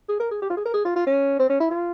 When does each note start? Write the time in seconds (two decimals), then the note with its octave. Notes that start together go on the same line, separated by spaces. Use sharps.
0.09 G#4
0.20 A#4
0.31 G#4
0.42 G4
0.50 F4
0.57 G#4
0.65 A#4
0.74 G#4
0.85 F4
0.96 F4
1.06 C#4
1.39 C4
1.49 C#4
1.60 E4
1.71 F4